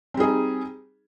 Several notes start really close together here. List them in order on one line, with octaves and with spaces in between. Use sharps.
C4 G3 G#4 D#4